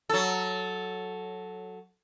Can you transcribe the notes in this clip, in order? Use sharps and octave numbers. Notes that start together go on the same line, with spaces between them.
F#3 A4